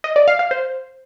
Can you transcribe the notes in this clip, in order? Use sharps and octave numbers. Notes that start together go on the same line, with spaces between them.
D#5
D5
F5
F5
C5